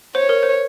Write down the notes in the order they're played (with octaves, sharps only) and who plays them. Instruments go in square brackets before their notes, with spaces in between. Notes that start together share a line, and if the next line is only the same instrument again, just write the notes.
[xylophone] C5 [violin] C#5
[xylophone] A#4
C5